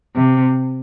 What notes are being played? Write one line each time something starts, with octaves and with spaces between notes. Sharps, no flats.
C3